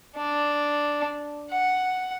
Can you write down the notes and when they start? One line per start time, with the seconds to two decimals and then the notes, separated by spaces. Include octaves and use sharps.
0.17 D4
1.51 F#5